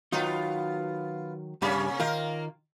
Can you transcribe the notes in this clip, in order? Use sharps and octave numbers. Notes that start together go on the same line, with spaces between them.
D#3 F#3 B3 D#4 F4
G2 C3 G3 A#3 C#4 B5
D#3 A#3 F4 A#4